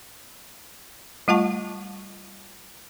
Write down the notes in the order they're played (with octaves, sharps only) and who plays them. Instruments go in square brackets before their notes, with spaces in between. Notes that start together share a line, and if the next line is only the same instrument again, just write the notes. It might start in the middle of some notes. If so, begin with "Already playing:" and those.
[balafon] G3 A3 F4 F#5 A5 C#6